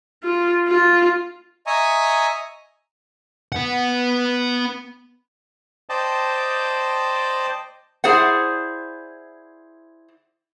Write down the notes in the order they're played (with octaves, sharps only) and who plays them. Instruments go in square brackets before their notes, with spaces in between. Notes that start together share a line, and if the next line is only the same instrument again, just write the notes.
[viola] F4
F4
[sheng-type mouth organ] D#5 E5 G#5 A#5 C#6 D#6
[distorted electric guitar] B3 F#5
[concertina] C5 D5 D#5 G5 A5
[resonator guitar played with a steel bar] E4 G#4 C5 D5 F#5